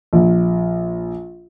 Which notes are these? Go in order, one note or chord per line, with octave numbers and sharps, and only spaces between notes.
A#1